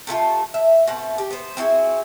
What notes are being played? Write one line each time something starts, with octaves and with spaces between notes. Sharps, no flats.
C3 A3 F4 A4
E5
B2 A3 C4 F#5
G4
B3 C5
C4 E4 F#4 G#4